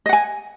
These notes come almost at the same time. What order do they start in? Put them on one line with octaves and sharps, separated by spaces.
D#5 F#5 G#5